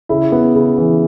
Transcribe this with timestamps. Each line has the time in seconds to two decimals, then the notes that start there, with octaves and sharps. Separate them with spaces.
0.09 C#3 E4
0.32 B3
0.55 C#3
0.78 E3